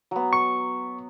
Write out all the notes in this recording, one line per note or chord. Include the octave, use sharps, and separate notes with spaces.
F#3 B3
C#6